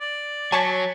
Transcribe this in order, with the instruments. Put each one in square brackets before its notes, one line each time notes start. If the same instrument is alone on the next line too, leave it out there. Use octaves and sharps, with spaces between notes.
[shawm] D5
[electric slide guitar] F#3 [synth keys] C#5 B6 [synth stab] G#5 A5 C#6